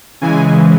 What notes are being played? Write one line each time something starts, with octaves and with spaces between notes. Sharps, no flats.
C#3 E3 G#3 G#5